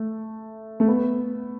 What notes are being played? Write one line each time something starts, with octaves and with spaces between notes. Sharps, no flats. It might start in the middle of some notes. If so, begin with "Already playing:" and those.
Already playing: A3
A3
B3